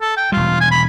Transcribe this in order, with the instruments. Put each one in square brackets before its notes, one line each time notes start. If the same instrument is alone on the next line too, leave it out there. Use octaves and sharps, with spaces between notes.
[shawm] A4
G5
[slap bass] E1 G3 [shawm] F4
[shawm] G#5
B5